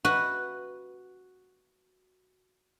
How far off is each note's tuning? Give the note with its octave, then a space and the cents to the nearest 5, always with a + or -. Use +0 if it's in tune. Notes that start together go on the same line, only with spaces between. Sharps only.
F#4 +0 B4 +0 E5 +0